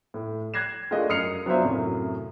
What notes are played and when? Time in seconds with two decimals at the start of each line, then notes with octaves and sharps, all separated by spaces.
0.14 A2
0.54 F#6 G#6 A#6 C7 E7
0.91 G#3 A3 D4 F4 A#4 D#5
1.09 F#2 D#6 F6 C7 C#7 F7
1.46 F#3 B3 D4 F4 C5 E5
1.64 F#2 A2 C3 F#3